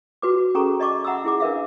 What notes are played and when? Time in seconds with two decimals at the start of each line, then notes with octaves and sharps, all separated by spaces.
0.22 F#4 B4 D6
0.55 C#4 G#4 A4 A#5 C#6
0.80 D5 D#5 A5 C#6 D6
1.04 E5 F#5 A#5 B5 D#6 E6
1.24 E4 G#4 D6
1.40 D4 A#4 B4 E5 F5